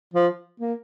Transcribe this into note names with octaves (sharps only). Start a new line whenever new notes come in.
F3
A#3